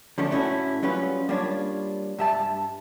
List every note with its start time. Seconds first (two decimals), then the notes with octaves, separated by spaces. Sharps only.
0.18 D3 F3 A3 C#4 D4
0.31 A2 A3 C#4 D#4 E4 F#4
0.83 F#3 G3 C#4 F4 B4
1.29 G3 A#3 D4 F4 C#5
2.18 G2 E5 A5